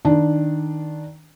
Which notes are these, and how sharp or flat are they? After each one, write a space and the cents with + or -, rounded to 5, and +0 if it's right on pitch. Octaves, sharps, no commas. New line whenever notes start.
D#3 +0 D4 +0